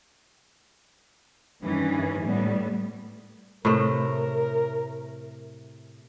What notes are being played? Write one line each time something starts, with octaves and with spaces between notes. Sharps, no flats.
G2 D#3 E3 C#4
A2 G3 B3
A2 C3 A3 A#4